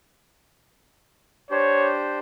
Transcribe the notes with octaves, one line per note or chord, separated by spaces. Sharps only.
D4 G4 C5 C#5